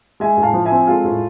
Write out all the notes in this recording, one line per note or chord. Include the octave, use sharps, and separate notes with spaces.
G#3 E5 G#5
A2
F5 A5
F3
E5 G#5
C4
G#3 F4 A4
A2